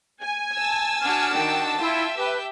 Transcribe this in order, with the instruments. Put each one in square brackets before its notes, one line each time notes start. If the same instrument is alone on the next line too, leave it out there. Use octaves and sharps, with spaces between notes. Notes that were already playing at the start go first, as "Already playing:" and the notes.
[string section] G#5
[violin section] A5 E6
[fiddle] D4 F#4 [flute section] F6
[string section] D#3 [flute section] G5
[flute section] E4 [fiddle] F4 G5 [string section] E5
[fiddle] G4 G5 [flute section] B4